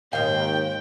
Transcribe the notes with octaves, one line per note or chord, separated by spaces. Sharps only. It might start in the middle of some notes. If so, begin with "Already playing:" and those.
D#2 G#2 D#3 F5 G5